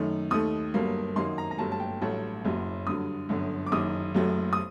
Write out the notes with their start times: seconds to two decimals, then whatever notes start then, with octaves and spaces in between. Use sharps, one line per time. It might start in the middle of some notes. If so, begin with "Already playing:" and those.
Already playing: F#2 D#3 A3
0.31 D#2 D#3 A3 D#6
0.74 G1 G2 F#3 A#3
1.16 F#2 D#3 F#3 A#3 C6
1.38 A#5
1.51 A#5
1.58 G1 G2 F#3 A3 A5
1.72 A5
1.80 G5
2.01 A1 G2 F#3 A3 A5
2.45 F#1 F#2 F#3
2.87 G2 D3 F#3 D#6
3.29 G1 F#2 D3
3.66 D6
3.72 F#1 F#2 D#3 D#6
4.15 F#1 F#2 F#3 A3
4.53 D#6